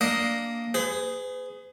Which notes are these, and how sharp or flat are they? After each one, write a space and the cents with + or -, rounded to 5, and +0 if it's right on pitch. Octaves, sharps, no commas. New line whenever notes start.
A#3 -5 D4 +0 D#5 +5
G#4 +0 B4 +45